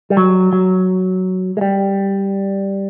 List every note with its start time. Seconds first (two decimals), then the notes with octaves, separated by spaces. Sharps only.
0.10 G3
0.17 F#3
0.53 F#3
1.57 G#3
1.61 G3